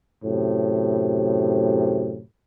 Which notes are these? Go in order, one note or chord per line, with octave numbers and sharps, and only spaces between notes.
F#2 A2 C3